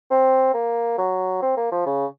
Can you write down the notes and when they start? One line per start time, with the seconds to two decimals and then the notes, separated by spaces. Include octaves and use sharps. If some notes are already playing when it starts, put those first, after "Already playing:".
0.11 C4
0.54 A#3
0.98 F#3
1.42 C4
1.57 A#3
1.72 F3
1.86 C#3